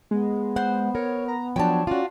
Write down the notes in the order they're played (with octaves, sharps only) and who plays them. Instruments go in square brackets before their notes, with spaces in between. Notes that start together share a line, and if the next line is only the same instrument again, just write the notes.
[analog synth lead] G#3 [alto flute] B3
[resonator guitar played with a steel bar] C5 [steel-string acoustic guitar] F#5
[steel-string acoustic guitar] A#4 [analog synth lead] C#5
[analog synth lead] A#5
[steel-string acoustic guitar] F3 F#3 D4 [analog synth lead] C#5 [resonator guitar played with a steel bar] G5 A5
[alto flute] C#4 [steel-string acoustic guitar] F4 F#4 [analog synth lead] D5